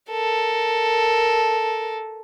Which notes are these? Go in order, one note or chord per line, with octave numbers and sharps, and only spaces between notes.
A4 A#4